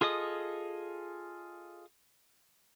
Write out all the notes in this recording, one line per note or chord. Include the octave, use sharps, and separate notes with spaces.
F4 G#4 A4 D#5 D#6